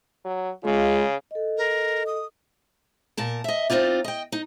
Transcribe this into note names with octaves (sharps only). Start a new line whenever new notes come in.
F#3
C#3 G#3 F4
A4 D#5
A#4
D#6
A#2 A#4 A5
D#5 E5
C4 C#4 D#4 F4 D5
D#5 G5
D#4